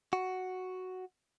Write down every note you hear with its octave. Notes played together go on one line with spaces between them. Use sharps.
F#4